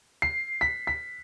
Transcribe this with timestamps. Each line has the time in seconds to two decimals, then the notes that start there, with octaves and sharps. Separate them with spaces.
0.22 C7
0.61 B6
0.87 B6